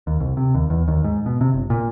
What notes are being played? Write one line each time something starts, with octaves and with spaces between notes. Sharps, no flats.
D#2
C2
C3
D#2
E2
D#2
G#2
B2
C3
G1
A#2